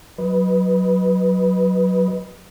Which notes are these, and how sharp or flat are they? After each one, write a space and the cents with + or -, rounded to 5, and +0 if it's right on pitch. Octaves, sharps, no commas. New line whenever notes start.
F#3 +0 B4 +0 D#5 +0